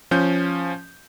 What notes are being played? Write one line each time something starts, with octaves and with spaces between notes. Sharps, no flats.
F3 C#4 G6